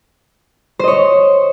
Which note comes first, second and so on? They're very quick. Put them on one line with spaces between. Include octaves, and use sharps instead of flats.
C5 D#5 C#5